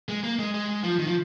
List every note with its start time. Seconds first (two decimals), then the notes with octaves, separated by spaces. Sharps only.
0.09 G#3
0.24 A#3
0.39 G#3
0.54 G#3
0.69 G#3
0.83 F3
0.99 D#3
1.07 F3